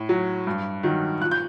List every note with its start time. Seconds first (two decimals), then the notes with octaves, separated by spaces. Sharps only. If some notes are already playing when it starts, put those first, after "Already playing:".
Already playing: A2
0.09 F#3
0.47 G2
0.83 D#3 F#3
1.20 A#2 F#6
1.31 G6